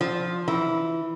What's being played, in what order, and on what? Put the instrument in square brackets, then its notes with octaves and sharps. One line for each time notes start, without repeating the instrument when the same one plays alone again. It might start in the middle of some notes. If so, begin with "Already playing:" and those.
[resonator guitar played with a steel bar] F3
E3